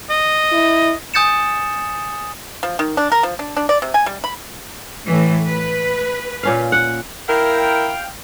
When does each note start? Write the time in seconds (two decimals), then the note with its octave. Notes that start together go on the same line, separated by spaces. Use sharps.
0.10 D#5
0.52 E4
1.14 G#5 D#6 G6 A6 C#7 E7
2.63 F3
2.79 D#3
2.97 D4
3.12 A#4
3.23 F3
3.39 D4
3.57 D4
3.69 D5
3.82 C3
3.94 G#5
4.06 G3
4.24 B5
5.07 A2 E3 A3
5.48 B4
6.43 A#2 C#4 F5
6.72 F#5
7.29 E4 A#4 F5 G5